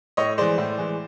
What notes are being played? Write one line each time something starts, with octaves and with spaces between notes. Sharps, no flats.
A2 C#5 D#5
E3 G#3 C5 D5
A2
E3 G#3